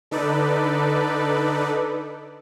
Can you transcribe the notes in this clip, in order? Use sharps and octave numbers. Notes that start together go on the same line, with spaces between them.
D3 D#4 A4 B4 D5